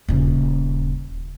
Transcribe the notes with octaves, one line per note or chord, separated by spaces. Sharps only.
D#1 C#3